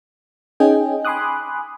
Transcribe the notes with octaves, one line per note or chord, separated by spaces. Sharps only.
C#4 D#4 G#4 D#5 G5 G#5
G#5 B5 C6 D6 D#6 F#6